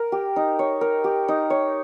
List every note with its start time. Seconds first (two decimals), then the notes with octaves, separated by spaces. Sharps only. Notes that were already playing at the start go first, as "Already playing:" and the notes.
Already playing: A#4
0.12 G4
0.36 D#4
0.59 C#5
0.81 A#4
1.04 G4
1.28 D#4
1.50 C#5